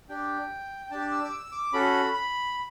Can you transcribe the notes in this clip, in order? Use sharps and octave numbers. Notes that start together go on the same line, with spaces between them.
D4 G4 G5
G5
D4 G4 A5
E6
D6
E6
D6
C#4 F#4 A4 B5
B5